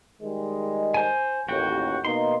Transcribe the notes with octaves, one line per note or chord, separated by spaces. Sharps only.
D#3 G3 G#3
C5 G#5
A1 D#2 F#4 G5
B2 A#3 D#4 C6